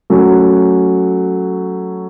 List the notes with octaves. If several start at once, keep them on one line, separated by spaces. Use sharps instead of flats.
F#3 A3 C#4 F#4